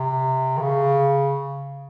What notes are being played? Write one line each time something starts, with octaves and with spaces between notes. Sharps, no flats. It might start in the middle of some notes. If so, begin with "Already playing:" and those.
Already playing: C3
D#3
C#3